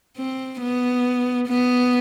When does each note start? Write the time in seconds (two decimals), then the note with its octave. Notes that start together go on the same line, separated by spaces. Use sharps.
0.17 C4
0.61 B3
1.48 B3